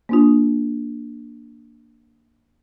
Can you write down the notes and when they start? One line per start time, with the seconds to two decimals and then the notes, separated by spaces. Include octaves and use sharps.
0.09 A#3 D4 F4